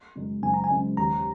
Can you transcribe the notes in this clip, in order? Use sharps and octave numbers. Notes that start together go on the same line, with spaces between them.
F#2 C#3 G#3
F#1 G#5
A#5
G#5
F#2 C#3 G#3
D#2 A#5